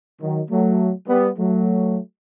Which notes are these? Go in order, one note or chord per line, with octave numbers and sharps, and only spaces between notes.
D#3 F#3
F#3 A3
G3 B3
F#3 A3